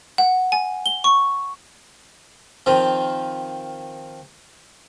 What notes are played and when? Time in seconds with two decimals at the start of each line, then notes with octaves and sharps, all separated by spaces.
0.18 F#5
0.52 G#5
0.86 G7
1.04 C#6
2.66 D#3 F3 C4